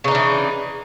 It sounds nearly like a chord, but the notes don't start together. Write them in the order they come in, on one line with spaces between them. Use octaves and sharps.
C#3 D#4 D4 E3